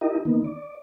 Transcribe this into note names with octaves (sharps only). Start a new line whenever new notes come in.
D#4 E4 G4 A#4 D#5
D#3 A#3 B3 D#4
D5